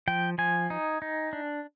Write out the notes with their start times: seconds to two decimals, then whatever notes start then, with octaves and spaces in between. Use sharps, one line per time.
0.08 F3 G5
0.38 F3 G#5
0.70 D#4
1.02 D#4
1.33 D4